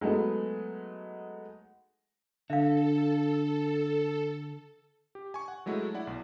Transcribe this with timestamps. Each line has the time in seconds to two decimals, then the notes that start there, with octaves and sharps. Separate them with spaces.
0.01 F#3 G#3 A3 B3 D#4
2.50 D3 A4 E5 F5
5.15 G4
5.34 G#5 C#6
5.48 F#5
5.66 F#3 G#3 A3 E4 F#4
5.94 E4 D5 F#5
6.07 B1